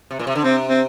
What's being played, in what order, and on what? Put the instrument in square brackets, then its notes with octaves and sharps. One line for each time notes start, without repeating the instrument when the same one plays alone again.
[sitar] C3
A#2
C3
D3
[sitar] C3 [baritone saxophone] C4
[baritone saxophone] C4